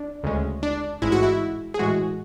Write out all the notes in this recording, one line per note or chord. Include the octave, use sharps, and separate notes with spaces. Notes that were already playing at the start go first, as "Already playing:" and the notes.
Already playing: D4
D2 C#3 G#3 C#4
D4
A1 G#2 G#3 E4
F#4
E4
G#4
A2 E3 G#3 F#4